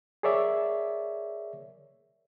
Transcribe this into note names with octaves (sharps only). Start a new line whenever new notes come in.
G#4 A#4 C#5 D5 E5